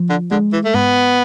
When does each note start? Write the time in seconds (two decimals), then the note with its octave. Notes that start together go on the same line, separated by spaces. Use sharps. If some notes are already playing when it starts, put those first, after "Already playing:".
Already playing: F3
0.09 D3
0.31 D3 G#3
0.52 E3
0.64 A3
0.74 G#2 B3